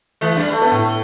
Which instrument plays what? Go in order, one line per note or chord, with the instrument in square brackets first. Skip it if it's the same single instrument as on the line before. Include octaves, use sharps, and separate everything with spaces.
[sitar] E3 [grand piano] A3
[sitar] G3 [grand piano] D4
[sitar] A3
[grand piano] B3
A2